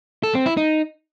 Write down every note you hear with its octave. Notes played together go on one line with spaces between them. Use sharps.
A4
C4
E4
D#4